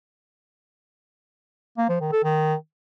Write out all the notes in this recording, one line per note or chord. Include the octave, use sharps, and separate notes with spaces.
A#3
F3
D#3
A4
D#3